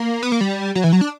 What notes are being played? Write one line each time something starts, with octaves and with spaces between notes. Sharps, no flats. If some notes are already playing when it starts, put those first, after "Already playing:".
Already playing: A#3
B3
A#3
G3
F#3
E3
F#3
D4